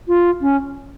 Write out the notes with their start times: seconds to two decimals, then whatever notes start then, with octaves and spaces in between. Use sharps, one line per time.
0.08 F4
0.41 C#4